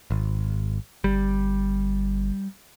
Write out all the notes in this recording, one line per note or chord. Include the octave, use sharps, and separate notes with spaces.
G#1
G1 G3